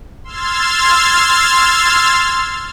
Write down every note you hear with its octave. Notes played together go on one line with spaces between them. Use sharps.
C6 E6 F6 G#6 A6